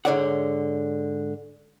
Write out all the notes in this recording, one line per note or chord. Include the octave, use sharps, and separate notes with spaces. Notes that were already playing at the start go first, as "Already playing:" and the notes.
G#2 D3 C#5 D5 E5 F#5